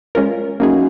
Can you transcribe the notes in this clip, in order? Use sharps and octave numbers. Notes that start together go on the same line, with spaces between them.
G#3 C#4 F4 A#4
F#2 A#3 D#4 G#4